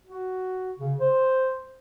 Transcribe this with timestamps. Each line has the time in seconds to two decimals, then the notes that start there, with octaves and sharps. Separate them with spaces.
0.07 F#4
0.79 C#3
1.00 C5